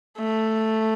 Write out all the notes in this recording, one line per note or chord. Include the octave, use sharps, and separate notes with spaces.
A3